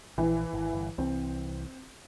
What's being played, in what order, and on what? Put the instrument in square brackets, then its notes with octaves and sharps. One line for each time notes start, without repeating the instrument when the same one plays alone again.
[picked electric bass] A#1 [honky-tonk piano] E3
[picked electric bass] G#1
G1
[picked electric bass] C2 E3 [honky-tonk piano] C4